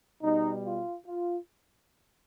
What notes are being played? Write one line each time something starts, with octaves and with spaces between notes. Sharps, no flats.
B2 G3 D#4
F4
F4